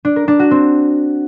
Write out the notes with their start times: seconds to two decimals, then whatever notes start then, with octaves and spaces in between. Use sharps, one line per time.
0.05 D4
0.16 A#4
0.28 D4
0.39 F#4
0.51 C4